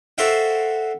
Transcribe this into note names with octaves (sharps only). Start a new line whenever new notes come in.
F#4 A4 C5 E5 F5 G5